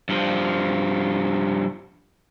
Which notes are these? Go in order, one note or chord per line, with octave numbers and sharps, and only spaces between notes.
G2 F3